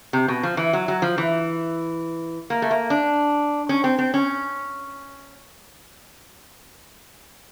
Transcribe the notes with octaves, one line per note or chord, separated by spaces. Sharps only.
C3
B2
F3
E3
F#3
F#3
F3
E3
A#3
A3
A#3
D4
C#4
C4
C4
C#4